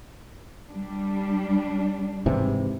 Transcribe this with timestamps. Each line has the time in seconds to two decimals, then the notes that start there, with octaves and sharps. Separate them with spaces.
0.70 G3 D4
2.26 G#2 C3 E3